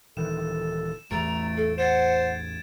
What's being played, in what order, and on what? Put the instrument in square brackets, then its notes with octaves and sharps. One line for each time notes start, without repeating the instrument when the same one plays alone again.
[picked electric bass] D#1 D#3 E3 [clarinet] A4 [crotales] E7
[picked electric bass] A1 E2 E3 [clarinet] A3 [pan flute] A#5 [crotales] A6 D7
[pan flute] A4
[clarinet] C5 [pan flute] F#5 [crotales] G#6 A6 E7